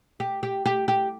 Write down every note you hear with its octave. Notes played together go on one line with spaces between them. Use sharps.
G4
G4
G4
G4